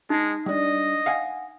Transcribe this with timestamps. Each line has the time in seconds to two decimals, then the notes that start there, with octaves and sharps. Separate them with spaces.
0.10 G#3 D#4
0.46 G3 D4 D#5
1.06 F5 F#5 G#5